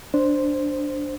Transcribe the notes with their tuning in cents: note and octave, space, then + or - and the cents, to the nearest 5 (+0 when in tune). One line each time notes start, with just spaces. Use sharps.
D4 +0 C5 +0